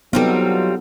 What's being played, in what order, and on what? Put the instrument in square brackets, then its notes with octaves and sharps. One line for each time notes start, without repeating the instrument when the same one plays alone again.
[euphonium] F#3 [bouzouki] G3 C4 F4 [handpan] B3 D#4 A4